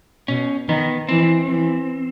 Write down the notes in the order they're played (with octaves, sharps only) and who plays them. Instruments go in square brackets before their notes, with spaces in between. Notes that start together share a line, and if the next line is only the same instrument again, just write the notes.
[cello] B2 [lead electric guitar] C#4
[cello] D#3 [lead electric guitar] B3
[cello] E3 [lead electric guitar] C4
[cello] E3